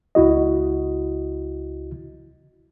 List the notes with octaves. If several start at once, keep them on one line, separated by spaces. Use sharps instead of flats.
C#2 E4 F#4 D#5